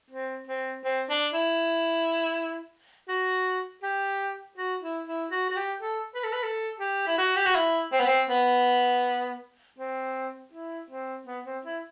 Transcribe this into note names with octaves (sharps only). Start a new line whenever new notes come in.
C4
C4
C4
D4
E4
F#4
G4
F#4
E4
E4
F#4
F#4
G4
A4
B4
A4
B4
A4
G4
E4
F#4
G4
F#4
E4
C4
B3
C4
B3
C4
E4
C4
B3
C4
E4